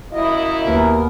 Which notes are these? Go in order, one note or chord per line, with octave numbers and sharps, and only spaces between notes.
F#2 A#3 E4 D#5
D#2 B3 A#4